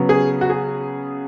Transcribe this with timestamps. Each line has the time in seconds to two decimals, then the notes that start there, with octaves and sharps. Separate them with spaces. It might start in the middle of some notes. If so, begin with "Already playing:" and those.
Already playing: C#3 F#3 B3
0.09 G#4
0.41 F#4
0.50 G#4